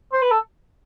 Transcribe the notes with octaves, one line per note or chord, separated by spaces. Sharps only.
C5
B4
A4